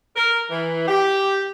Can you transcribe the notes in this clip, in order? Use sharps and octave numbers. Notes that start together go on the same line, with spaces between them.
A#4
E3
G4